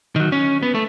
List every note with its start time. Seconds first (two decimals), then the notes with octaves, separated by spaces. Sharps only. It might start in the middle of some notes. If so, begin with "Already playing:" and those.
0.16 D#3 F#3
0.32 C#4
0.63 B3
0.75 A3